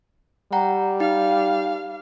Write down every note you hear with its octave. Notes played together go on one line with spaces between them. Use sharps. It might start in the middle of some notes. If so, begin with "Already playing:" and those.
G3 F#5 G5 A#5
D#4 F5